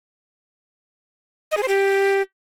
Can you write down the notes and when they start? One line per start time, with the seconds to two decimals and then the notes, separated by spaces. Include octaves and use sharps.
1.52 D#5
1.57 G#4
1.63 C5
1.68 G4